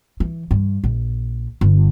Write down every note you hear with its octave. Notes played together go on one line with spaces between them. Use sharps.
E3
G2
A#1
G1